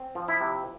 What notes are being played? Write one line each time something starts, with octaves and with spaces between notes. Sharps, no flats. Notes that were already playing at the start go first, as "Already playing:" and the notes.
Already playing: C4
F3
E4
C3